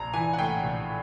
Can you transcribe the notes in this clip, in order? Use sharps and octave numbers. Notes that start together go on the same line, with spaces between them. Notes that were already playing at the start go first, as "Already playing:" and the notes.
Already playing: A#1 A#5
E3 G#5
F#5
A2 G5
A#1